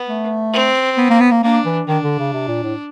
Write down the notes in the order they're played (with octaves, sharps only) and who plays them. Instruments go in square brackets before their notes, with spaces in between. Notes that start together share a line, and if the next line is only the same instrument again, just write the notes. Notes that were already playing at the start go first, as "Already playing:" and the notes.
Already playing: [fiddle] B3
[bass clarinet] A3
[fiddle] C4
[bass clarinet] B3
A#3
B3
A#3
[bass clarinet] A#3 [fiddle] D4
[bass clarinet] E3
[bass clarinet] D#3 [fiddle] D4
[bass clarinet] D3
C#3
C3
A#2
A2